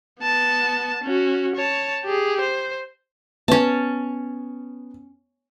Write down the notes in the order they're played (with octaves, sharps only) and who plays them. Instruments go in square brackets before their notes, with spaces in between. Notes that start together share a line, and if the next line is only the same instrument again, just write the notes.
[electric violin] B3 A5
C#4 F#4
C#5 A5
G4 G#4
C5
[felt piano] B3 [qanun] C#4 A5